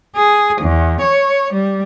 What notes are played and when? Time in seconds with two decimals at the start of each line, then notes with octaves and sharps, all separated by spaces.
0.16 G#4
0.61 E2
1.01 C#5
1.53 G3